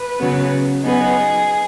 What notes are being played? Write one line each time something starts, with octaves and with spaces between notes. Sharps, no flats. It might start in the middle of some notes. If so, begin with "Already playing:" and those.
Already playing: B4
C#3 F#3 B3
F#3 B3 D#4 G#4